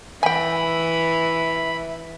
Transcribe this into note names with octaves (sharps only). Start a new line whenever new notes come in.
E3 E5 G5 G#5 B5